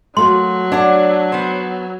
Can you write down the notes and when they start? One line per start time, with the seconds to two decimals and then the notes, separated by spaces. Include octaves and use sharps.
0.17 F#3 A3 A#3 F#4 C6
0.72 D4 C#5 F#5
1.32 B3 C5